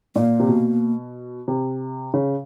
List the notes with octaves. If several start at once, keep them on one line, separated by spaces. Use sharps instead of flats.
A#2 A#3
C3
B2
C3
C#3